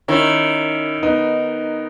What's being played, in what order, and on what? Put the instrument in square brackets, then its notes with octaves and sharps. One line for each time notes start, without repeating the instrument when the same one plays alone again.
[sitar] D#3 [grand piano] C#4 E4
[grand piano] B3 D#4